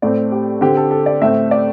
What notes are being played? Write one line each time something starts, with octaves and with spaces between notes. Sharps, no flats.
A2 A3 C4 D5
G4
D3 C4 G4
A4
A4
D5
A2 A3 C4 E5
D5